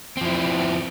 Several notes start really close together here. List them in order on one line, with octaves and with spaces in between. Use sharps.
C4 F3 E4